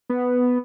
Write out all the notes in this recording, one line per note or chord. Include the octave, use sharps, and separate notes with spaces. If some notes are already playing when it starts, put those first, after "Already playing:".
B3